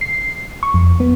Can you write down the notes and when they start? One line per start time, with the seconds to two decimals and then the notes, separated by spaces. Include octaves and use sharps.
0.01 C7
0.63 C#6
0.74 F2
1.00 B3